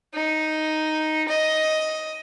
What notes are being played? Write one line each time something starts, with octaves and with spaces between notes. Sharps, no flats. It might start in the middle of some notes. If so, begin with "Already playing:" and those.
D#4
D#5